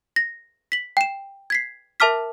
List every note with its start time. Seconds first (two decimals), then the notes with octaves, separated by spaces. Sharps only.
0.16 A#6
0.72 B6 F#7
0.97 G5 E7
1.50 G#6 B6 C7
2.00 A#4 E5 A5 D6 F6 B6